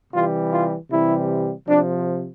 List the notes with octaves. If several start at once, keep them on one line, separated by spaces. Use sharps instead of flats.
C3 E3 G3 F4
F4
C3 E3 G3 E4
C3 F3 D4